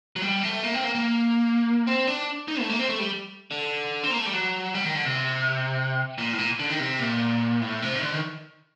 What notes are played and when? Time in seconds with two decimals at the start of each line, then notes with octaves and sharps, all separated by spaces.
0.16 F#3
0.22 G3
0.43 A3
0.63 A#3
0.74 C4
0.84 A#3
0.95 A#3
1.87 C4
2.07 D4
2.48 D#4
2.60 A3
2.70 A#3
2.79 C4
2.89 A3
3.00 G3
3.51 D3
4.03 C4
4.11 A#3
4.18 A3
4.26 G3
4.34 F#3
4.74 G3
4.85 D#3
4.95 D3
5.05 C3
6.18 A#2
6.33 A2
6.39 A#2
6.59 D3
6.70 D#3
6.79 C3
7.00 A#2
7.62 A2
7.82 C3
7.95 D#3
8.03 D3
8.13 D#3